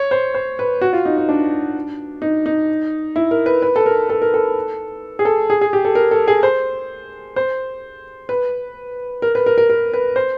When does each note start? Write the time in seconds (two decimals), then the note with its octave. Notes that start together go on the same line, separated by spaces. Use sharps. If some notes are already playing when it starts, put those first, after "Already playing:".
Already playing: C#5
0.11 C5
0.34 C5
0.59 B4
0.81 F#4
0.93 F4
1.05 D#4
1.17 D#4
1.29 D4
2.22 D#4
2.46 D#4
3.16 E4
3.31 A#4
3.46 B4
3.62 B4
3.76 A4
3.86 A#4
4.09 A4
4.22 A#4
4.34 A4
5.19 G#4
5.25 A4
5.50 G#4
5.61 G#4
5.73 G4
5.85 A4
5.95 A#4
6.11 A4
6.28 G#4
6.43 C5
7.36 C5
8.29 B4
9.22 A#4
9.35 B4
9.46 A#4
9.58 A#4
9.70 A#4
9.94 B4
10.16 C5